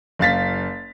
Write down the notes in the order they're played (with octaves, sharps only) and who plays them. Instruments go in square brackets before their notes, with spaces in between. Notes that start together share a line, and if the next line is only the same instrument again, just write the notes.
[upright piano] F#1 F5 A6 B6